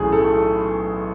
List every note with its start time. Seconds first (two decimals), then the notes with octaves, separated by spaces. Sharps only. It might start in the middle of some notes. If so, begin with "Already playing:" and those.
Already playing: B1 A2 E3 A3 C#4 G#4
0.12 A4